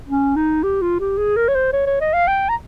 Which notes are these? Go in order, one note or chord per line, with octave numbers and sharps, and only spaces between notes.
C#4
D#4
G4
F4
G4
G#4
A#4
C#5
C5
C#5
C#5
D#5
F5
G5
A#5